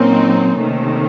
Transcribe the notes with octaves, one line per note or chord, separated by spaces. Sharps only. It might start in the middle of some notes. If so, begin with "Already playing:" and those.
Already playing: A#2 F#3 A#3 C4 C#4 D#4
C3 D#3 A3